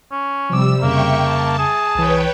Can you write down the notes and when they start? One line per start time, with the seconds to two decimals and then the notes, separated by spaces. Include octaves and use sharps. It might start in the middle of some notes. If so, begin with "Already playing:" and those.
0.11 C#4
0.50 C3 F3 G3 D6 E6
0.83 F2 C#3 A#3 E5 G5 C#6
1.24 A5
1.58 G#4
1.95 C2 E3 B4 C#5 G5